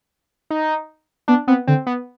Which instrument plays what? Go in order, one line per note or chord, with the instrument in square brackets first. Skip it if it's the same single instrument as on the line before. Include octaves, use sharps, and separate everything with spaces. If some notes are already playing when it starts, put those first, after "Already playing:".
[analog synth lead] D#4
[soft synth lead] B3 [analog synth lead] D4
[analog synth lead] B3 [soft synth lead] C4
[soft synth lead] D3 [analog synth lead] C4
[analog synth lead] B3